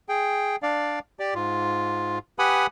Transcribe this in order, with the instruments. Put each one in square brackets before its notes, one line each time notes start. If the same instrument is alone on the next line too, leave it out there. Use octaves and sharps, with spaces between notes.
[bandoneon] G#4 G5
D4 D5 F5
G4 D5
G#2 F4
G4 B4 F#5 G#5 B5 D#6